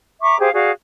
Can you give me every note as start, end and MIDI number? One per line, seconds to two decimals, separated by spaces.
0.22 0.37 76
0.22 0.37 82
0.22 0.37 85
0.22 0.37 86
0.40 0.49 67
0.40 0.49 68
0.40 0.49 72
0.40 0.49 77
0.54 0.71 66
0.54 0.71 68
0.54 0.71 74
0.54 0.71 77